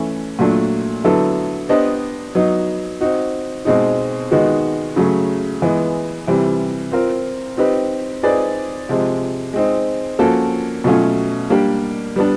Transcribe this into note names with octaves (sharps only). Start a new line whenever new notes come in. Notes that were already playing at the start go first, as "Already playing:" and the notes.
Already playing: E3 A3 C#4 E4
A#2 F#3 A3 D4
D3 F#3 B3 E4 A4
B3 D4 G4 C5 D#5
F#3 B3 D#4
C4 D#4 F#4
B2 G#3 C4 D#4
D#3 G#3 B3 D#4 F#4
C#3 F#3 A3
E3 G#3 B3
C3 E3 G3
C4 F4 A#4
C4 D#4 G4 B4
C4 D#4 G#4 B4 D5
C3 F3 G#3
G#3 C4 D#4
F3 A#3 C#4 F#4 A4
B2 F#3 A3 C#4 F4
G3 A#3 D4 G4
G3 B3 D4